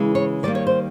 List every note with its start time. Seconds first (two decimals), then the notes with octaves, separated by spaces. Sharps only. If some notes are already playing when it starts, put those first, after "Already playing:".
Already playing: C#3 E3 G#3
0.15 C#5
0.43 D#3 G3 A#3 D5
0.55 C#5
0.67 C5